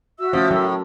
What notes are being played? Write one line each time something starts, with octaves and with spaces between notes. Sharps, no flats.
F#4 E5 E6
F3 A3 C#4
A2 F#3 A#4